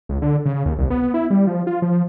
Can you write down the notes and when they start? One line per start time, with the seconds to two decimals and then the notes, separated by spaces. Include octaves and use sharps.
0.09 C#2
0.22 D3
0.45 C#3
0.66 D#2
0.78 C2
0.90 B3
1.14 E4
1.30 G3
1.47 F3
1.67 F4
1.82 F3